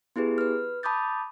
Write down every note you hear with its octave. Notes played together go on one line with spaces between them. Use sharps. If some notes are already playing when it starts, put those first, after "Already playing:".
B3 E4 G4 G#4 B4
B4 F6
A5 B5 D6 D#6 G6 A6